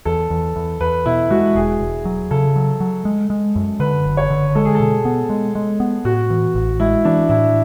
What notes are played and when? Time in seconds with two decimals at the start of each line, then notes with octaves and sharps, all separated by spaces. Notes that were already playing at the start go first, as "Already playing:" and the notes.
0.05 E2 A4
0.30 E2
0.56 E2
0.81 E2 B4
1.06 B2 E4
1.31 G#3 F#4
1.55 E1 G#4
1.80 E1
2.05 F#3
2.31 C#3 A4
2.56 F#3
2.80 F#3
3.05 G#3
3.30 G#3
3.56 F#2
3.80 D3 B4
4.05 F#1
4.17 C#5
4.30 D3
4.55 G#3 A4
4.65 G#4
4.75 A4
4.80 B2
5.05 B3
5.30 G#3
5.55 G#3
5.80 B3
6.05 A2 F#4
6.30 E3
6.55 A1
6.80 G#3 E4
7.05 E3 D4
7.29 A2 E4